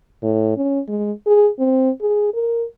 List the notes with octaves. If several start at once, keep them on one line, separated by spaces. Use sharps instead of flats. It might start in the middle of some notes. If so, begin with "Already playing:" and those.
A2
C#4
G#3
G#4
C4
G#4
A#4